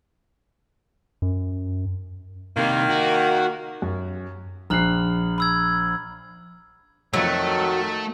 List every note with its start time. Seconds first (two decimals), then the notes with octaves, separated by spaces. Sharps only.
1.22 F#2
2.57 C3 D#3 G3 A#3
2.90 F#4
3.82 F#2
4.70 A#1 A#5 F6 F#6 C7 F#7
5.38 B5 E6 G#6
7.14 F2 D#3 F#3 A3 E5 E6